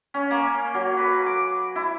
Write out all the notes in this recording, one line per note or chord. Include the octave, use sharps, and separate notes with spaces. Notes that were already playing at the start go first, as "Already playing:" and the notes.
C#4
A#3
F#3
B4
D6
E4